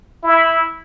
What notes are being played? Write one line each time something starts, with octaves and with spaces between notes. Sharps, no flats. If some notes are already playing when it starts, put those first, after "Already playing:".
E4